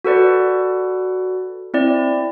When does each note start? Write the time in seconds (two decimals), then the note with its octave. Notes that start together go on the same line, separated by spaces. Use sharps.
0.04 F#4 A4 B4 D5
1.74 C4 E4 D5